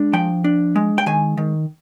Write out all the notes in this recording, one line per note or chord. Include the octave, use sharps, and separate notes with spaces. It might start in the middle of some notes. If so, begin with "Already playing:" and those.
Already playing: G#3 D4
F3 G5
D4
G#3
G5
D#3 G#5
D#3